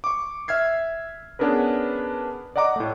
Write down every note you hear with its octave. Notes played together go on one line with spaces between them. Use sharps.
C#6 D6
E5 F6 G#6 C7
B3 C#4 D4 G#4 A#4 B4
D5 D#5 F#5 A#5 D6
A2 A3